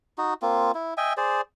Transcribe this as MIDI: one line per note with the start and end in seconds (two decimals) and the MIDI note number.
0.18 0.34 63
0.18 0.34 66
0.42 0.72 58
0.42 0.72 60
0.42 0.72 65
0.75 0.94 64
0.97 1.13 75
0.97 1.13 76
0.97 1.13 79
0.97 1.13 80
1.17 1.41 68
1.17 1.41 72
1.17 1.41 74